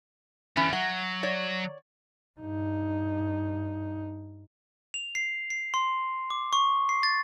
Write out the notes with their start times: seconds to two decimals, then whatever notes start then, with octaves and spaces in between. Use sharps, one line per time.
0.57 E3 G3 B3 C#4
0.73 F#3 F#5
1.23 C#5 D5
2.40 G2 D#4
4.94 F7
5.15 C7
5.50 C7
5.74 C6
6.30 D6
6.53 C#6
6.89 C7
7.03 A6